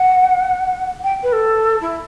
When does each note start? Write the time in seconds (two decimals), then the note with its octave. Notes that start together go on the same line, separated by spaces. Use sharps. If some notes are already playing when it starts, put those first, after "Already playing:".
Already playing: F#5
1.04 G5
1.23 B4
1.32 A4
1.81 E4